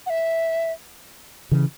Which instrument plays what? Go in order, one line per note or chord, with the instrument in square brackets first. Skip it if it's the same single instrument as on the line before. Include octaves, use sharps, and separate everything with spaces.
[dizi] F#5
E5
[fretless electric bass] C#3 E3